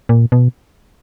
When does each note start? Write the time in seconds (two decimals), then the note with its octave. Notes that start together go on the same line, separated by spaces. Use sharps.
0.09 A#2
0.32 B2